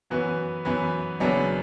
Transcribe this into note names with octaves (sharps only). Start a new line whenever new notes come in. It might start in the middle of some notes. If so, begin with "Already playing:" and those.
F#2 E3 B3 F#4 B4
F#2 E3 B3 F#4 B4
F#1 F#2 F#3 B3 D4